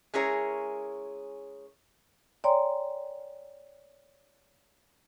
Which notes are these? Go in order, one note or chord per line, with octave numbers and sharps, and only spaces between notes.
G#3 C#4 E4 G#4 A#4 C#5
C#5 D5 G5 G#5 A#5 C6